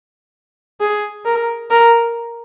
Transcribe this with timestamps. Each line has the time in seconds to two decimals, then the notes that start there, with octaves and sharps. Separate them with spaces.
0.80 G#4
1.25 A#4
1.70 A#4